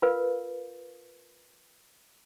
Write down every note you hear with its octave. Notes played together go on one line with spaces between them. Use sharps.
F4 A#4 B4 F5